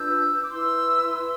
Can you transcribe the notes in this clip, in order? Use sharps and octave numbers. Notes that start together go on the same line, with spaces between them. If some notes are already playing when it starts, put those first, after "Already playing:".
Already playing: D4 F4 B4 E6 G6
D6
E4 B4 C6 E6
C6 E6